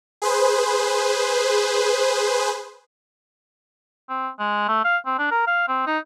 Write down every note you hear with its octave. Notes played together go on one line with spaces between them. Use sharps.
G#4 B4 C5
C4
G#3
A3
F5
C4
D4
A#4
F5
C4
D#4